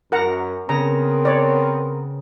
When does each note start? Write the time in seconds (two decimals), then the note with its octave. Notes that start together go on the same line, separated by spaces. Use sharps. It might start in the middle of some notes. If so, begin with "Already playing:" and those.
0.12 F#2 A#4 F#5 A#5
0.69 C#3 B3 C4 A#4 A#5
1.25 C#5 D5